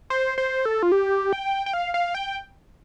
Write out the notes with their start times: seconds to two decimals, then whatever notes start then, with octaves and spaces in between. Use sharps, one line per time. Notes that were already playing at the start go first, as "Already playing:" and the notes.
0.10 C5
0.38 C5
0.65 A4
0.83 F4
0.92 G4
1.33 G5
1.66 G5
1.73 F5
1.94 F5
2.15 G5